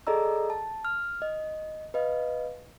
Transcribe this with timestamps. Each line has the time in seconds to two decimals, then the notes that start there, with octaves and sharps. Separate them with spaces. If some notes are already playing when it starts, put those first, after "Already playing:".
0.07 G#4 A4 D5 D#5 A#5 E6
0.50 A5
0.85 F6
1.22 D#5
1.94 B4 D#5 F5